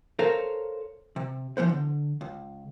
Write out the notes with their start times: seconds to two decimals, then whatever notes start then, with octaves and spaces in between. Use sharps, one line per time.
0.19 A4 A#4 C5 C#5 F5
1.16 C3
1.57 E3 F3 B3 C5
1.69 D3
2.21 C#2